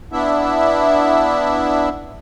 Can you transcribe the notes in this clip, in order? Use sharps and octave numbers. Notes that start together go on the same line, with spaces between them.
B3 D4 E4 E5